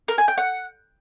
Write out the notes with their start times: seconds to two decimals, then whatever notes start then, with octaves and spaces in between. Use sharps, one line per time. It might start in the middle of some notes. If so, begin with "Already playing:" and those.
0.08 A#4
0.18 G#5
0.28 G5
0.38 F#5